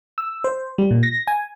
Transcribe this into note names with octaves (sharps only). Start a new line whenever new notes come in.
E6
C5
G3
A#2
A#6
G#5